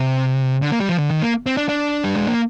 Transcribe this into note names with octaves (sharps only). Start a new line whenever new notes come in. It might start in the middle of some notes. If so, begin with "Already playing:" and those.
Already playing: C3
D3
A#3
G3
F3
D3
D#3
A#3
C4
D4
D4
G3
G#3
A#3